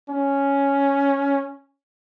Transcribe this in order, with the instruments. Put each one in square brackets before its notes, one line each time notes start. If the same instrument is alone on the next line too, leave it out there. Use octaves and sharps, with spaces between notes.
[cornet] C#4